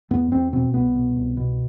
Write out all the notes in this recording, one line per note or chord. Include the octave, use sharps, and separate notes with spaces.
E2 B3
E2 C4
B2 C4
C2 B3
B2
C2
B2